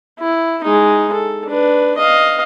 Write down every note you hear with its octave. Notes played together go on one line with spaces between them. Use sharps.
E4
G#3 D#4
A4
D4 B4
D#5 F5